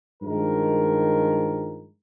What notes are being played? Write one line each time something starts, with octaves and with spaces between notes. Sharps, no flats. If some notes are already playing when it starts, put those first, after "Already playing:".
G2 D#3 F3 G#3 A#4